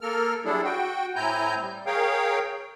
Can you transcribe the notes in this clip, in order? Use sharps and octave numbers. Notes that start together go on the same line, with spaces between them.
A#3 A4 A#4 F6
F#3 G3 D4 E4 G#4 A4
F#4 G5
A2 C4 E4 G#5 A#5 G6
G3
G#4 A#4 C#5 F5 G5